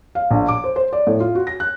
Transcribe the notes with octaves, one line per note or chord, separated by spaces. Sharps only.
F5
A#1
D6
C5
C5
D5
A2
F4
F#4
A#6
F#6